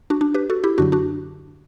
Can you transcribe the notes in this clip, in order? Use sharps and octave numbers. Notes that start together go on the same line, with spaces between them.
D4 F#4
D4
G4 B4
F#4 A4
E4 G4
F#2 D3 F#3 D4 F#4
D4 F#4